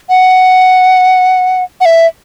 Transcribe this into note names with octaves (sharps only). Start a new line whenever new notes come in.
F#5
F#5
E5